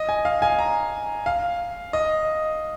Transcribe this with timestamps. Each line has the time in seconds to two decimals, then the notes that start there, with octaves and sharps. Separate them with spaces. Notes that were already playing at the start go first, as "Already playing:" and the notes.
Already playing: D#5
0.09 G#5
0.25 F5
0.42 G#5
0.59 A#5
1.26 F5
1.93 D#5